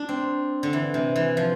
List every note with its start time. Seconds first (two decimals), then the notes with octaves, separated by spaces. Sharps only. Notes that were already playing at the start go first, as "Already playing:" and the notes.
Already playing: D4
0.09 C4
0.63 D3
0.73 E3
0.94 C3
1.16 E3
1.37 F3